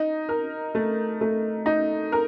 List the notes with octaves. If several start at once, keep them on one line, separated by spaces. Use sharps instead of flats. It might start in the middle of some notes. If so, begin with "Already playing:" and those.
Already playing: D#4
A#4
A3
A3
D#4
A#4